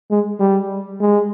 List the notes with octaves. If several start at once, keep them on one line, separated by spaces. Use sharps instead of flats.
G#3
G3
G#3